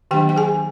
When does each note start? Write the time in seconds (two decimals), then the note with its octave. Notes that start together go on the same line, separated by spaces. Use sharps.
0.11 D#3 F#3 A#3 D4 G4 G5
0.29 G5
0.36 G#4 G#5